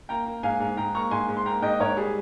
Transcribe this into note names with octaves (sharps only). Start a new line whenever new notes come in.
A#3 G5 A#5
A#3
G#2 F5 G#5
G#2
G#2 G5 A#5
A#3 A#5 C#6
G#2 G#5 C6
G#2
C6
A#3 G5 A#5
G#2 D#5 G5
G#2 A#4 C#5
G3 G#4